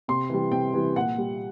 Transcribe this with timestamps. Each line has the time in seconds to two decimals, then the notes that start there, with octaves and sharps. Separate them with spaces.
0.08 C3 C6
0.30 E3 G3
0.52 C3 G5
0.74 E3 G3
0.95 A#2 F#5
1.18 G3